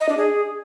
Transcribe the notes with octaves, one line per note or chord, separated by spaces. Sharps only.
D#5
D4
G#4